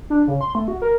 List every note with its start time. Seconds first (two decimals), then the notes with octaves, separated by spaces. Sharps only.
0.10 D4
0.28 C#3
0.41 C6
0.55 A3
0.68 F#4
0.82 A#4